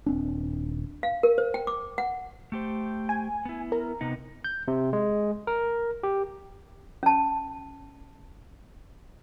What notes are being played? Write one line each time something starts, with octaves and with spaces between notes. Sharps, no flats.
D#1 C4 D4
F5
A#4
C5
G5
D6
F#5
A3 G4 C5
G#5
B3 E4
A#4
C3 B3 D#4
G6
C3
G#3
A#4
G4
C#4 A5